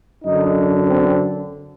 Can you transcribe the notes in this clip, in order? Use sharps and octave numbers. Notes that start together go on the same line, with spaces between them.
F#2 D3 D#4
C4